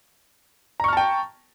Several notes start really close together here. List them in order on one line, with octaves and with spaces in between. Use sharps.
A#5 C#6 F6 A5 G5